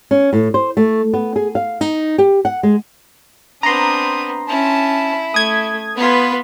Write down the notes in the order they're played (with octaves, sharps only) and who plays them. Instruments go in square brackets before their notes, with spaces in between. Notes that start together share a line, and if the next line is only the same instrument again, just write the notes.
[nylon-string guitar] C#4
A2
C5
A3
B3
G#4
F5
D#4
G4
F#5
G#3
[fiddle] B3 C4 [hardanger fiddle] D4 D#6 [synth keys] A#5 C6
[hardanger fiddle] C#4 A5 [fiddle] E4
[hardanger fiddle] A3 [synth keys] D#6 G#6
[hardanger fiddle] B3 [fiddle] F4 B4